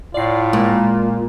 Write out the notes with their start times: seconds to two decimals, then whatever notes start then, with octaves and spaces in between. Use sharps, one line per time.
0.14 A2 F4 D5 C7
0.53 A#2 G#3